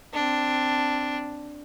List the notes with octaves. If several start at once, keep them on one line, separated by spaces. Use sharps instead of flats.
C4 D4